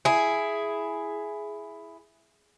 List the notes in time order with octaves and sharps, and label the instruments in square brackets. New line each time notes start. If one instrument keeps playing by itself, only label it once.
[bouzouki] E4 G#4